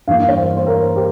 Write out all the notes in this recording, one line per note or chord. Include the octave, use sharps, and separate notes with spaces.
G2 E3 A#3 F5
C#5
C5
C5
A#4
G4